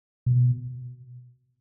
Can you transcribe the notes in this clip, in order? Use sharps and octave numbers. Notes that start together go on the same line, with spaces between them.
B2